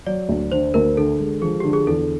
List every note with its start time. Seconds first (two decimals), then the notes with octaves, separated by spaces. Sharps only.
0.07 F#3 D5
0.29 D2
0.52 D3 C5
0.74 D2 A#4
0.97 D3 A4
1.20 G#3
1.42 F3 G#4
1.60 D3 G4
1.73 G#4
1.87 E2 A4